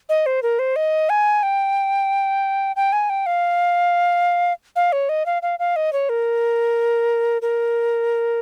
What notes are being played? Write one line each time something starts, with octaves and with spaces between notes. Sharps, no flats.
D#5
C5
A#4
C5
D#5
G#5
G5
G5
G#5
G5
F5
F5
C#5
D#5
F5
F5
F5
D#5
C#5
A#4
A#4